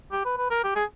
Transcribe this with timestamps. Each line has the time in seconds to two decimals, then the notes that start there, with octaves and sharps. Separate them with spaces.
0.12 G4
0.25 B4
0.38 B4
0.51 A#4
0.64 G4
0.76 G#4